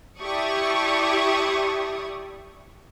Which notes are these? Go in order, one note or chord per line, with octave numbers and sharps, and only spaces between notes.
E4 G4 D5 A5 C#6 D#6